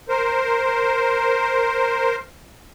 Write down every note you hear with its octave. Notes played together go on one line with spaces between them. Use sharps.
A#4 C5